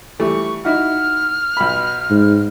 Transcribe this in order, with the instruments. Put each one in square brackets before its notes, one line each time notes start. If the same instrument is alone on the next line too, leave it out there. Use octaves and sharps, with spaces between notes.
[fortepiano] E3 G3 A3 [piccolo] C#6
[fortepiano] D#4 E4 F#4 [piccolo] F6
[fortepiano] B1 B5
[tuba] G#2